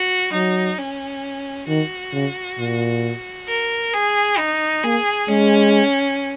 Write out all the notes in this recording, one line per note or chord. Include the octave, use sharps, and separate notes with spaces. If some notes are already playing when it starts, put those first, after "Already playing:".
Already playing: F#4
F#3 D#4
C#4
D#3 F#4
C#3
A#2
A#4
G#4
D#4
A#3 G#4
G#3 C#4